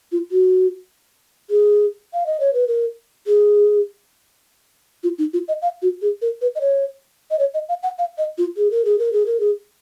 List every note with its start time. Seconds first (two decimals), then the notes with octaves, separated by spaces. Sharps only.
0.12 F4
0.31 F#4
1.50 G#4
2.13 F5
2.26 D#5
2.40 C#5
2.54 B4
2.68 A#4
3.27 G#4
5.03 F4
5.18 D#4
5.33 F4
5.48 D#5
5.62 F5
5.82 F#4
6.02 G#4
6.22 A#4
6.42 B4
6.55 D#5
6.61 C#5
7.31 D#5
7.39 C#5
7.54 D#5
7.69 F5
7.83 F#5
7.99 F5
8.18 D#5
8.38 F4
8.57 G#4
8.71 A#4
8.85 G#4
8.99 A#4
9.13 G#4
9.26 A#4
9.40 G#4